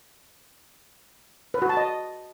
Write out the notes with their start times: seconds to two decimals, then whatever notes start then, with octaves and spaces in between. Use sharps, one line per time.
1.54 B4
1.62 F#4
1.69 A5
1.77 D#5